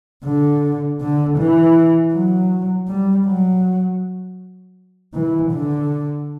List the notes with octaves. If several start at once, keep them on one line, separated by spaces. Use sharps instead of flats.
D3
D3
E3
F#3
G3
F#3
E3
D3